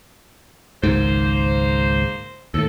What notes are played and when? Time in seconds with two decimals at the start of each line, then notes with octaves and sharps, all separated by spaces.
0.83 G#1 C#2 G#2 A#3 C5
2.54 D#2 A2 A4